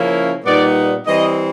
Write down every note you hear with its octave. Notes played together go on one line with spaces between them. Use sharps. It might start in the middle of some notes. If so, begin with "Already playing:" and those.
Already playing: C#3 F3 A#3 C#4 E4
A#2 G3 B3 D#4 D5
E3 G3 C4 D#5